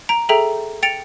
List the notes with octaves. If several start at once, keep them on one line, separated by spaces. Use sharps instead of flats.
A#5 D7
G#4 A4 E5 G5 A#5
G5 A6 C#7 D7 F7